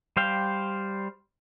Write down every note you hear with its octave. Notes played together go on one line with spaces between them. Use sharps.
G3 C5 F5 G5